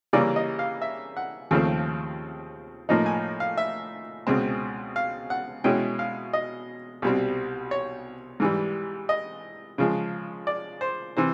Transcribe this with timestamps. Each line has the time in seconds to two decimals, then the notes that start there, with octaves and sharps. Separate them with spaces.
0.13 C#3 E3 G3 A#3 C#4 D5
0.36 D#5
0.59 F5
0.82 E5
1.17 F#5
1.51 D#2 C#3 F3 A3 C4
2.89 A2 F3 A#3 D#4
3.06 G#5
3.40 F5
3.57 E5
4.27 C#2 B2 G#3 C4
4.96 F5
5.30 F#5
5.64 B2 G#3 C#4 E4 G5
5.99 F5
6.33 D#5
7.02 C2 B2 G3 C4
7.71 C#5
8.40 G#2 E3 G3
9.09 D#5
9.78 C#3 F3 G#3
10.47 D5
10.81 C5
11.17 C3 E3 C5